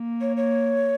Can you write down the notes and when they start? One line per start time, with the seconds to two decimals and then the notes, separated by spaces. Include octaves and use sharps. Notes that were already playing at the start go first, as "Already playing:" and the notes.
Already playing: A#3
0.21 C#5
0.37 C#5